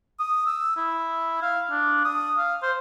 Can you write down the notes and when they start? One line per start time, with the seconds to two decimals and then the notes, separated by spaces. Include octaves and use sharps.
0.19 D#6
0.46 E6
0.77 E4
1.42 F5
1.71 D4
2.05 D#6
2.37 F5
2.62 C5